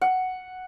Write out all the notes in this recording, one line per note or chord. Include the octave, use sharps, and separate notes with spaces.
F#5